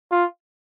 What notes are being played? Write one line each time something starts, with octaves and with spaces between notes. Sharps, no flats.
F4